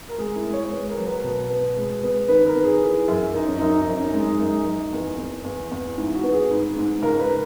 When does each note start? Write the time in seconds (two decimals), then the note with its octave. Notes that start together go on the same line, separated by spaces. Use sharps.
0.09 A#4
0.18 G#3 G#4
0.36 E4
0.44 G#3
0.53 C#5
0.71 B3 B4
0.89 A#4
0.98 F#3
1.06 B4
1.24 B2
1.50 B3
1.77 G#3
2.03 B3
2.28 D#3 B4
2.46 A#4
2.56 B3
2.64 G#4
2.81 E3
3.08 F#2
3.34 F#2 D#4
3.46 C#4
3.57 F#2 D#4
3.81 D#4
3.87 F#2 C#4
3.97 C#4
4.04 D#4
4.13 G#3
4.22 D#4
4.39 F#2
4.66 F#2
4.93 E2
5.18 E2
5.45 E2
5.71 E2
5.97 G#2 E4
6.15 F#4
6.24 B3
6.33 G#4
6.51 G#2
6.76 G#2
7.02 C#2 A#4
7.20 B4